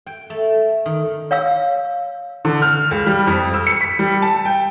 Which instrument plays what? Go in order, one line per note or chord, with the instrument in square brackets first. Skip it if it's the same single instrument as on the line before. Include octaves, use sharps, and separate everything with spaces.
[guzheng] G5
A3
D#3
[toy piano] C#5 F5 E6
[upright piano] D3
F6
C#2
G3
F2
E6
C#7
B6
G3
A5
G5